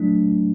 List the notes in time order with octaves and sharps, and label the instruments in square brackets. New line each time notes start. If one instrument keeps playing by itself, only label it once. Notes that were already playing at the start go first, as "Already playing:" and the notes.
Already playing: [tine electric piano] F#3 A3 D4